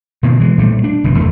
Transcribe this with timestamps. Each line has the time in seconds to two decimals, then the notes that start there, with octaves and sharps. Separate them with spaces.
0.23 B2 D#3 A#3
0.40 E3 F3 G#3
0.58 A#2 G3 A3
0.84 D4
1.04 F#1 B2 E3
1.17 E2 A3